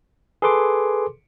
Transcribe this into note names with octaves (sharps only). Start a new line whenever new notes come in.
G#4 A4 B4 C6 D6